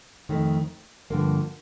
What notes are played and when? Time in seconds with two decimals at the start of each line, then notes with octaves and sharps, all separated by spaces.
0.29 F2 D#3 A3
1.10 G2 D3 F3 A#3